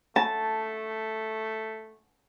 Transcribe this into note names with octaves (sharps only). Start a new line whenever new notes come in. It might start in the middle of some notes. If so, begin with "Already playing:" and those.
A3 A5